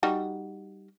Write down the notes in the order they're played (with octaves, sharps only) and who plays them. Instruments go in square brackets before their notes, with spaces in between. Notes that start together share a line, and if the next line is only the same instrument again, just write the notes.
[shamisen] G3 D#4 F#4